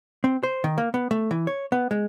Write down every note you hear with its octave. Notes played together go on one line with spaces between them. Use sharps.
C4
C5
D#3
A#3
B3
A3
E3
C#5
B3
G#3